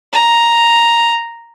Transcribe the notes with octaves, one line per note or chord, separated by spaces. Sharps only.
A#5